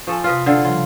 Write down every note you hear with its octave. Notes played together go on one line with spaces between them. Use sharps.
F3 A4 G#5 C#6
C3 F4 B4 D#5 F6
D3 F4 A4 F#5 E6
C#3 F3 G3 F4